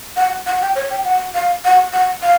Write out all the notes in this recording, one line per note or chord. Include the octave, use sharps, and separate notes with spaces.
F#5
F#5
G5
C#5
G5
F#5
F5
F#5
F#5
F5